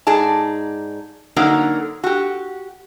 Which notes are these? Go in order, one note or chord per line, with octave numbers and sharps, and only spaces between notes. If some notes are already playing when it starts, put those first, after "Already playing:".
G#2 D#4 G#4 D5 A5
D3 F#3 A#3 D#4 F#4 A#4
F#4 G4